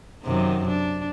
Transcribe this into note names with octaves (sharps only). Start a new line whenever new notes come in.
F#2 C3 D#3
D4